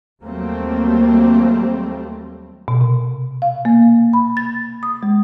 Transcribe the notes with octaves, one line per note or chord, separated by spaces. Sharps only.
D#2 F#3 G3 A3 A#3 C4
B2
C3
F5
A#3
B5
A6
D#6
G#3